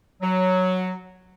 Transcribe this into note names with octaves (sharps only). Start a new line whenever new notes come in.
F#3